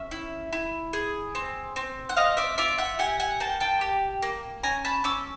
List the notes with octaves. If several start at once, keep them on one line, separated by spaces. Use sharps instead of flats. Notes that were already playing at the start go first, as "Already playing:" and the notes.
Already playing: C#4 E5
E4
E4
G#4
C4
C4
F#5
C4 D#5 F5
D5 E5
F4 D5 E5
E5 F#5
G4 F#5 G#5
F#5 G#5
A#3 G5 A5
G5 A5
G4
A#3
C#4 G#5 A#5
A5 B5
C#4 D6 E6